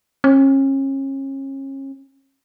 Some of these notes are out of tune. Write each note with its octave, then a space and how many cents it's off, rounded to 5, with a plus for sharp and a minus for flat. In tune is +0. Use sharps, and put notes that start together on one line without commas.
C#4 -35